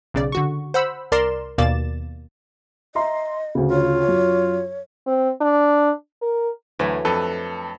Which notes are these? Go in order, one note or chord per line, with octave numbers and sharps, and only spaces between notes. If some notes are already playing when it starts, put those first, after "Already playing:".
B1 C#3 D5
D3 F#4 C#6
C5 F#5 B5 E6
C2 A#4 D5 A#5 C6 E7
D#2 B2 A#3 D5 A6 E7
D#5 E5 A#5 C6
D2 C#3
F4 C#5
F#2
C4
D4
A#4
D2 E3 F#3 A3
F2 D4 A4 B4 D#5